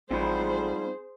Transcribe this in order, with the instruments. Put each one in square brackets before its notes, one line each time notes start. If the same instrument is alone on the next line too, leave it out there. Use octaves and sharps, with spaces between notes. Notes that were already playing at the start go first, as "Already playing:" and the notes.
[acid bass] A1 [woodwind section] F3 G3 [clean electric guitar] C4 D#4 B5 [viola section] G#4 C5